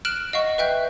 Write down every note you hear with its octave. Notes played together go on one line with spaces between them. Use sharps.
F6 F#6 D7 E7 F#7
D#5 F5 F#5 C#6
B4 E5 G5 F#6 G6